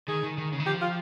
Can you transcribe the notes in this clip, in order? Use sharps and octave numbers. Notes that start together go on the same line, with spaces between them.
D#3 G#4
D#3
D#3
C#3
D#3
F3 G4
F4